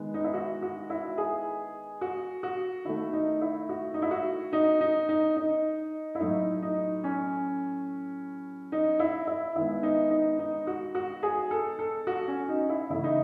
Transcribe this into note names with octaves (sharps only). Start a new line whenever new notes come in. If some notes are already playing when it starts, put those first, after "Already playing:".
Already playing: D#3 G#3 B3
D#4
E4
F#4
F#4
E4
G#4
F#4
F#4
D#3 A3 E4
D#4
E4
F#4
D#4
E4
F#4
D#4
D#4
D#4
D#4
E4
A2 F#3 A3 D#4
D#4
C#4
D#4
E4
E4
D#3 G#3 B3 E4
D#4
D#4
D#4
F#4
F#4
G#4
A4
A4
F#4
C#4
D#4
E4
C#3 E3 A3 E4
D#4